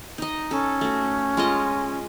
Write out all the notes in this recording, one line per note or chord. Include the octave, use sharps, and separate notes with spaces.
D#4 D#5
C#4 A4
A3 F#4
G#3 F4 D#5